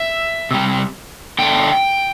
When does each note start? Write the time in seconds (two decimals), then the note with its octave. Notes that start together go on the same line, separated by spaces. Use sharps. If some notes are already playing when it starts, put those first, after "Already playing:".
Already playing: E5
0.51 C3 G3
1.39 D3 A3 G5